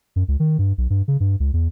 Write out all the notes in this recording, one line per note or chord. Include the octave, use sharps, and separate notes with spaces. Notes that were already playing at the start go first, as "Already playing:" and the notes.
F#2
C#2
D#3
G2
B1
G2
C#3
G2
C#2
E2